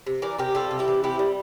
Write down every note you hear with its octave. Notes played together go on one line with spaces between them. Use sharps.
C3
E3 A#4 D5
C3 G4 A#4
G3 F4 A4
C3
E4 G4
E3
C3 E4 G4
G3